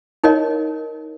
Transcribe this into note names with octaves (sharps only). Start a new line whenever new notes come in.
D#4 A#4 C#5 D#5